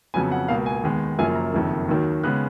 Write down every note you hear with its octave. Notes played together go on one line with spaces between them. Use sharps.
F2 C#3 F#3 B3 G#5
F#5
C#2 B2 A#3 F5
G#5
D#2 D#3 G#3 B3
F#1 F#2 F3 A#3 G#5
A#5
F#1 F2 D#3
D#2 D#3 F#3
C#3 G#3 B3 F#6